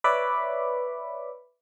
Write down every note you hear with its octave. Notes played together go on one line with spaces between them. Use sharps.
B4 C#5 D5 E5 B5 D6